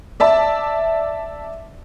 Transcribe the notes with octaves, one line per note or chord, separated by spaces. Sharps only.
D5 E5 A5